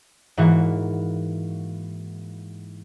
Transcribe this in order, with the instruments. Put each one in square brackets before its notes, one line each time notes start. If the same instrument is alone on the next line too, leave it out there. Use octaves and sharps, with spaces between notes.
[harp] G#2 E3 A#3 F#4